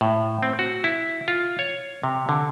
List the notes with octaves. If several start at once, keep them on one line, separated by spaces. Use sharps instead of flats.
A2
C4
F#4
E4
F4
C#5
C3
D3